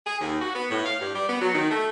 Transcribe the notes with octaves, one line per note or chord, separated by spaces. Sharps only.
G#4
D#2
F#4
B3
A2
F5
G2
G3
B3
F#3
D#3
A3